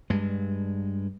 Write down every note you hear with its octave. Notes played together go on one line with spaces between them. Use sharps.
G2 G#3